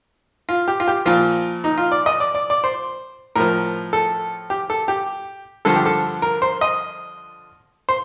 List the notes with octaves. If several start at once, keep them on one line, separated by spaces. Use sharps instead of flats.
F4
G4
F4
G4
A#2 F3 F4
D#4
F4
D5
D#5
D5
D5
D5
C5
A2 F3 A#4
A4
G4
A4
G4
G2 D3 F3 A4
G4
A4
A#4
C5
D#5
C5